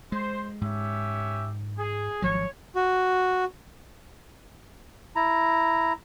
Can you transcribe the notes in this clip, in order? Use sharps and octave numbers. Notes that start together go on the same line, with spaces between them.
G#3 C5
G#2 C#4 G4 E5
G#4
G#1 F3 F#3 C#5
F#4
E4 A#5